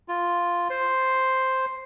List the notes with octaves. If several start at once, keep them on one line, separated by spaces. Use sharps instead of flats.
F4
C5